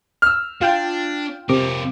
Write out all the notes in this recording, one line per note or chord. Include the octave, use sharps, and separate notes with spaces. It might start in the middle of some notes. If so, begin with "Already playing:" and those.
E6 F6
D4 F4 G5
F2 C3 A#4 D6